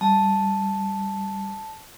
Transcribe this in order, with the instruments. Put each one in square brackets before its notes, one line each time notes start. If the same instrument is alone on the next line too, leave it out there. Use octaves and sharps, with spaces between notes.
[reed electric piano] G3 [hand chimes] A5